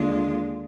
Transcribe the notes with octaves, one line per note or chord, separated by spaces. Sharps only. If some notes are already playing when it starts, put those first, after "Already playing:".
Already playing: D#2 D3 G#3 D4 F4